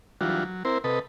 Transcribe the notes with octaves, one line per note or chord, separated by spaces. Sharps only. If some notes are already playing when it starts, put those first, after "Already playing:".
E3 F#3 G3 D4 F4 F#4
F#3
C4 E4 A#4 C5
C3 A4 B4 D#5